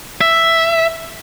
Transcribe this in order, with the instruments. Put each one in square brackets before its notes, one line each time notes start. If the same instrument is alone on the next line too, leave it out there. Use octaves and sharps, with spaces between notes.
[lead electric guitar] E5